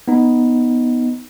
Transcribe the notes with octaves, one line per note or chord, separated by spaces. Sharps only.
B3 D#4